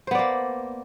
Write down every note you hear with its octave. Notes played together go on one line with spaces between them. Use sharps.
A#3 B3 C5 D5